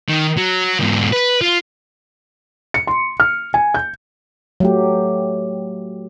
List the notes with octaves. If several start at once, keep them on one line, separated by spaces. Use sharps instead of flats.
D#3
F#3
E2 G#2
B4
F4
C#7
C6
F6
G#5
G6
F#3 A3 G4